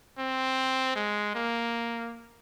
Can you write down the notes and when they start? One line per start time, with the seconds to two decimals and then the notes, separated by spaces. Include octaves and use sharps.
0.19 C4
0.96 G#3
1.35 A#3